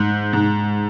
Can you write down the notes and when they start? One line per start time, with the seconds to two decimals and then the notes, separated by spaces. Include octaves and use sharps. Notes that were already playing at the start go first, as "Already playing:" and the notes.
Already playing: G#2
0.33 G#2